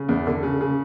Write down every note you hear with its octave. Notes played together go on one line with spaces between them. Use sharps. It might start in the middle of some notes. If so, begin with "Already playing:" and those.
Already playing: C#3
E2
D3
C#3
C#3